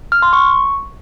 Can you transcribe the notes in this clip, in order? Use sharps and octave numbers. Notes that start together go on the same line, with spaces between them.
F6
C6
C#6